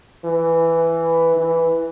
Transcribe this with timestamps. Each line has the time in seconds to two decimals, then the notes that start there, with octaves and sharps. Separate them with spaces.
0.24 E3
1.36 E3